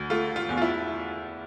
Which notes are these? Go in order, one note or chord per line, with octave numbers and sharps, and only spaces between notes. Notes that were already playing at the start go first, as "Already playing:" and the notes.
Already playing: D2
A3 F4
F4
E2
F4
E4